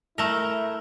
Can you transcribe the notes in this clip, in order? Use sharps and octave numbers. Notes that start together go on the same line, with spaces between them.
A3 E4 A#4